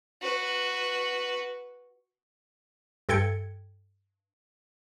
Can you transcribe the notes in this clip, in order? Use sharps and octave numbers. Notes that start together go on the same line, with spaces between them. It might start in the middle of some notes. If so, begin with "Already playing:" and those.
F#4 B4
G2 A4 G5 G#6 C#7